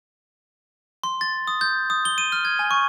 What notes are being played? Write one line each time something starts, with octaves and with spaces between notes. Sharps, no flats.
C6
A6
D#6
G6
D#6
G7
D#7
F6
G#6
G#5
C#6